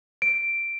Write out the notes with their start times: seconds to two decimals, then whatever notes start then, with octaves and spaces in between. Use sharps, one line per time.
0.22 D7